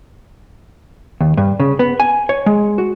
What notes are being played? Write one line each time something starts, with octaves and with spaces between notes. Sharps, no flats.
D#2
G2
C#3
B3
G#5
C#5
G#3
F#4